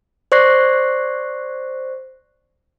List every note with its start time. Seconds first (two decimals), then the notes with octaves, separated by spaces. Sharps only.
0.32 C5 D5 C#6 F#6 A#6 C7